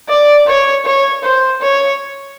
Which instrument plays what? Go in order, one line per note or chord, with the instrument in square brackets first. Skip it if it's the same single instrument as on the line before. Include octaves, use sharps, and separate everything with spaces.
[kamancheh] D5
C#5
C#5
C5
C#5